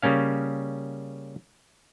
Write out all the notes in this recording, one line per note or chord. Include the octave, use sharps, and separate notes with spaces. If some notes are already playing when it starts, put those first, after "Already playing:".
C#3 G3 A#3 C#4 F5